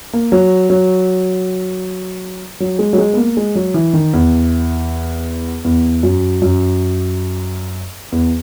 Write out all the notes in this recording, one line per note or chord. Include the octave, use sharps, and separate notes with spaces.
A#3
F#3
F#3
F#3
G#3
F#3
G#3
B3
A#3
G#3
F#3
E3
D#3
E2
E2
F#2
F#2
E2